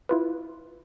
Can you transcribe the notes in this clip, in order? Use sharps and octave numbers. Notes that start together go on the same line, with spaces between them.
E4 F4 B4